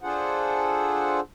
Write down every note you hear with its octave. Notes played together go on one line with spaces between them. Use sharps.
D4 F4 G#4 A4 C5 F#5